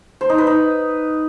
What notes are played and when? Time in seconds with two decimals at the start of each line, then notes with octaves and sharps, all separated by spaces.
0.21 C5
0.29 D#4
0.38 B4
0.47 D#4